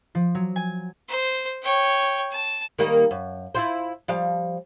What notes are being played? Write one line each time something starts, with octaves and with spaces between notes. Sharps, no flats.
F3
F#3
G#5
C5
C#5 G5
A5
D#3 G3 A#3
F#2
E4 F4 C5
F3 G3 F5